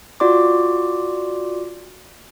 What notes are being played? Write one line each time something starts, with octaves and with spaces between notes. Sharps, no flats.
F4 F#4 D5 C6 D6